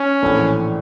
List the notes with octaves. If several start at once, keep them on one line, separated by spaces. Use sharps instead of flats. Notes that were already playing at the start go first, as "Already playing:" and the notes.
Already playing: C#4
A#1 A2 E3 A3 D4